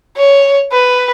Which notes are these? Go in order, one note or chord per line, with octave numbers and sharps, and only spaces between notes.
C#5
B4